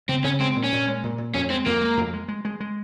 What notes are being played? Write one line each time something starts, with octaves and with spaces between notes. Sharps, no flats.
C#3 C4
C#3 C#4
G#3 C4
A#2
C#4
A#2
G#3
A#2
A#2
F2 C#4
G#3 C4
F2 A#3
G#3
F2
G#3
G#3
G#3
G#3